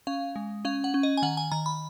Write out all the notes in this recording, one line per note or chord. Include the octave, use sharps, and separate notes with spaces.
C#4 F5
G#3
C#4 F5
F#5
C#4
D#5
G#5
D#3 F#5
G#5
D#3 A#5
B5